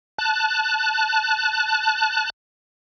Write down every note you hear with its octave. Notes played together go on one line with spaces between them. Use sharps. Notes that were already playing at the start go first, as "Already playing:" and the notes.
A5 F#6